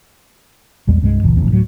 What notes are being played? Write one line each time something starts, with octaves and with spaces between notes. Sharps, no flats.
A#1 E2 G3 G#3
C2 G2 G3 G#3
F#1 C#2 A#2 E3
F1 A#1 E2 A2
D1 A2 F#3